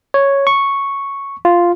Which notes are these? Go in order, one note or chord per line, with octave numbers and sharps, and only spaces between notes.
C#5
C#6
F4